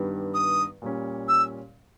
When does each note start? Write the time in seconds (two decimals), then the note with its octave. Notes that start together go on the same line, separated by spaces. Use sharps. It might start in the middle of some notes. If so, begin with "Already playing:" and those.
Already playing: G2 D#3 G3 B3
0.34 D#6
0.82 A#2 G3 C#4
1.28 E6